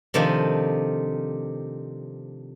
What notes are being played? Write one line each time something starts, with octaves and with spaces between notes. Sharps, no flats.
C3 D#3 F3 A3 D4